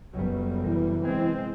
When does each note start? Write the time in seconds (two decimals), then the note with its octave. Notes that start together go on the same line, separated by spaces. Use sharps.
0.14 F#1 F#3 G3 A3 B3
0.63 C3 E3 A#4
1.04 G#3 C4 G#5